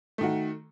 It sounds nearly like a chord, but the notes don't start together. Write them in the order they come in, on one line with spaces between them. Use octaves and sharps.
A3 D#3 F#4